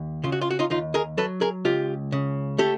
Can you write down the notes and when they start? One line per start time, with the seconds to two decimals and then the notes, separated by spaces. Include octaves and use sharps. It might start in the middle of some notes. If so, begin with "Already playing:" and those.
Already playing: D#2
0.24 C#3 F4
0.32 F#4
0.41 F4
0.51 F#4
0.59 D#4 F4
0.70 D#2 D#4 F4
0.94 G#4 A#4
1.17 F#3 A4 B4
1.41 G#4 A#4
1.65 C#2 F4 G4
2.12 C#3
2.58 A3 G4 A4